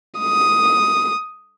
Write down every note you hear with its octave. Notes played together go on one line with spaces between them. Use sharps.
D#6